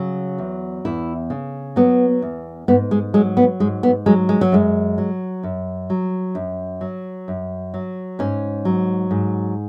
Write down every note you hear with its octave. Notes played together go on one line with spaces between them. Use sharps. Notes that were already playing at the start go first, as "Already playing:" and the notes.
Already playing: C#3 F#3
E2
E2 E4
C#3
F#3 B3
E2
G#2 B3
G#3
F#3 G#3
B3
G#2 G#3
B3
F#3 G#3
G#3
F#3
F#2 G#3
F#3
F#2
F#3
F#2
F#3
F#2
F#3
G#2 C#4
F#3
G#2